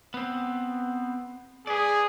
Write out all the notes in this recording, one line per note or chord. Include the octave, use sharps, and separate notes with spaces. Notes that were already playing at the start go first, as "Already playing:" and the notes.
B3 C4
G#4 B4 D5